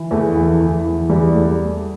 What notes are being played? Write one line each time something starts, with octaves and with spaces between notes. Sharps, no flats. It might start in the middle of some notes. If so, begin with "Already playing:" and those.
Already playing: E3
E2 A3
E3
E2
E3
E2 G3
G3 A3